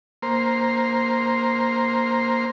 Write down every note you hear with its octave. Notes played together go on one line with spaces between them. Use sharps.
A#3 C5